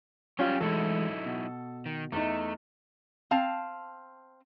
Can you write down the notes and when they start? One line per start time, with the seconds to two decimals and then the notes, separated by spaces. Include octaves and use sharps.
0.39 F#3 G3 C#4 F4 G4 C#5 G#5
0.61 E3 F#3 G#3 A3 D#4 E4 A4
1.26 B2
1.86 D#3
2.12 E2 A3 D#4
3.31 C4 F5 A5